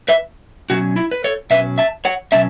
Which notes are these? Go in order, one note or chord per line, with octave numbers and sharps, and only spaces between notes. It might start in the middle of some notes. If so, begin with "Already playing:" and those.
B4 E5
B2 F#3 C#4 F#4
E4
B4
A4 C#5
B2 F#3 C#4 B4 E5
E5 A5
C#5 F#5
B2 F#3 C#4 E5 A5